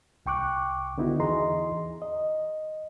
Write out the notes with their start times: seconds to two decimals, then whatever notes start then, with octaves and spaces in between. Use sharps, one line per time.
0.26 C2 G5 C#6 D6 F#6
0.98 D3 B3 D#4 E4 F#4
1.20 E2 E3 G#4 D#5 A#5 C6
2.02 D#5